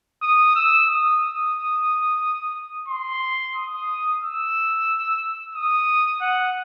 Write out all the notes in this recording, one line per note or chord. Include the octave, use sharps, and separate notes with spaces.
D#6
E6
D#6
C6
D#6
E6
D#6
F#5